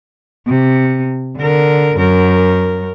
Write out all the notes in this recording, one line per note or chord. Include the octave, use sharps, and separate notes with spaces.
C3
D3 A#4
F#2 A#4